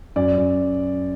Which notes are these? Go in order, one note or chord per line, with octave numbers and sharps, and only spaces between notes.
F#2 D5
F#2